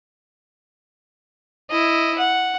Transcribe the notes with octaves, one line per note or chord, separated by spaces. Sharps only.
E4 D#5
F#5